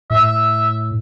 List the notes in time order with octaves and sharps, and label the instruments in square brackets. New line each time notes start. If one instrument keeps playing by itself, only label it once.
[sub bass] A2 [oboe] E5